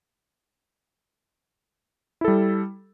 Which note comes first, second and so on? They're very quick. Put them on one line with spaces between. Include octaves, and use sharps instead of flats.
E4 A4 G3